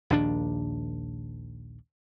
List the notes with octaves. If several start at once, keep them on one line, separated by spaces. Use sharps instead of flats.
A#1 D#2 D4